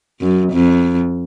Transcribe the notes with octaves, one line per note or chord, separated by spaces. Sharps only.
F#2
F2